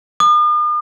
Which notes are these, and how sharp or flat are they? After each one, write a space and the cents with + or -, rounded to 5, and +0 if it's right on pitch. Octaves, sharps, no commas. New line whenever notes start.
D#6 -45